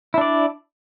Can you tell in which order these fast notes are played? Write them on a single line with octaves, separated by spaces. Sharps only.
E4 D4 D5